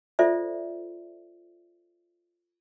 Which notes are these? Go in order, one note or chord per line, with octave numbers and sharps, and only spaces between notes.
F4 A4 C5 D5 E5